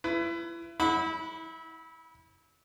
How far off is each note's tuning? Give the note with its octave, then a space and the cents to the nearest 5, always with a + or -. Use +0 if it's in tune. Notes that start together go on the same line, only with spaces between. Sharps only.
E4 +35 B4 +20
E4 -25 F#5 -15 B5 +0